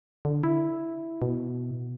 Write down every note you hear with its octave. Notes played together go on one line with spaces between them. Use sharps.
D3
E4
B2